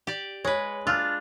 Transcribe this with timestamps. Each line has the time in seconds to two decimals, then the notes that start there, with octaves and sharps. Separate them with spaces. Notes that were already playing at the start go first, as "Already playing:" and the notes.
0.07 G4 D5
0.44 G#3 B4 C#5
0.87 D4 F4 E6 F6